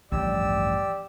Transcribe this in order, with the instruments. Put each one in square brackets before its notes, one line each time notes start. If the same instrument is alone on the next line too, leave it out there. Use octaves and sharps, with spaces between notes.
[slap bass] A1 F3 [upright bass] D2 G2 [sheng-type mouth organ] G4 E6 [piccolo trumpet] D5